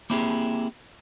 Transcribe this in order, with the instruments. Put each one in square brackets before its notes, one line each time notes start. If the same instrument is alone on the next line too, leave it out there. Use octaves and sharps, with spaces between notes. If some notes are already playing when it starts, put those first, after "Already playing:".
[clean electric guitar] A#3 C4 E4 F4 G4 G#4